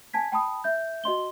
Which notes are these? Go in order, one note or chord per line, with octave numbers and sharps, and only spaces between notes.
G#5 A5 G#6 B6
G5 A5 B5 D#6
E5 G6
F#4 D#5 C6 G7